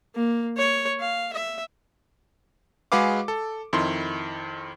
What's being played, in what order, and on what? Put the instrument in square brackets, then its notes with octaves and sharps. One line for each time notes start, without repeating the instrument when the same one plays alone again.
[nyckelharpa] A#3
C#5
F5
E5
[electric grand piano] G#3 F#4 G#4 B4 F5 D6
A4
F2 D#3 E4 C6